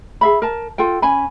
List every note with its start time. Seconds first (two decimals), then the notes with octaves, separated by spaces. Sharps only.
0.21 G#4 E5 B5
0.42 A#4 A5
0.78 F4 A4 G5
1.02 C#4 G#5 B5